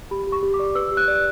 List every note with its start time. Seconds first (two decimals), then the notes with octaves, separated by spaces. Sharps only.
0.11 G4 B5
0.27 G4
0.32 C#6
0.43 G4
0.54 D6
0.59 D5
0.75 B4 E6
0.92 G4
0.97 F#6
1.08 D5